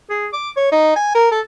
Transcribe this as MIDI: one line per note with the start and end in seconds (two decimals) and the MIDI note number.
0.10 0.27 68
0.33 0.51 86
0.57 0.71 73
0.72 0.95 63
0.96 1.13 80
1.14 1.30 70
1.31 1.40 69